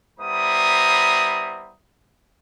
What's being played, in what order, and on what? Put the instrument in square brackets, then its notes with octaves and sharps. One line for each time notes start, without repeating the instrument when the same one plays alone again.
[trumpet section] G3 B3 E4 C5 A#5 D#6